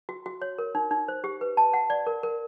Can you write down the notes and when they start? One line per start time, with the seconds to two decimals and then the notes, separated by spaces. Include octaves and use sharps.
0.09 F#4
0.26 F#4
0.42 C#5
0.58 A#4
0.75 D#4
0.91 D#4
1.08 C5
1.24 G4
1.41 B4
1.57 A5
1.73 F#5
1.90 D5
2.07 A#4
2.23 A#4